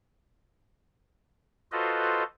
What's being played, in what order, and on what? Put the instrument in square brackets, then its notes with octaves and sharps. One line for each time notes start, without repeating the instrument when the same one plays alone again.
[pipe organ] F4 F#4 A4 B4 C5 D#5